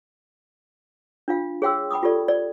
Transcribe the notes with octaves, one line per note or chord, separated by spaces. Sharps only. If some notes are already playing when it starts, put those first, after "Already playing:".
D4 F4 F5
G#4 C#5 F5 G5 C6 E6
G5 B5 D6 D#6
F4 G4 A4 D5
D5